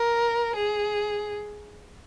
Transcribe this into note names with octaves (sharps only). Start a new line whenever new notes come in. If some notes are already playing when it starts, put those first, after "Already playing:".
Already playing: A#4
G#4